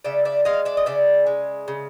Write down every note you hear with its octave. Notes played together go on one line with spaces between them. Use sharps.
C#3 D5 E5
D5 E5
G#3 D#5 F5
D5 E5
D#5
C#3 D5 E5
G#3
C#3